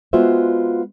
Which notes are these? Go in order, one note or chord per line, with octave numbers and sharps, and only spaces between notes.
G#3 B3 F4 F#4 C5 E5